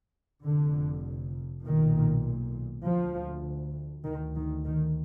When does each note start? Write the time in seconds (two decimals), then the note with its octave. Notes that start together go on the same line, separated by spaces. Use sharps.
0.45 F1 F2 D3
1.65 B1 A#2 D#3
2.84 D2 F3
4.05 D2 D#3
4.35 D#3
4.65 D#3